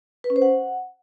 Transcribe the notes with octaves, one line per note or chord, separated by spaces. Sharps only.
B4
C#4
C5
F#5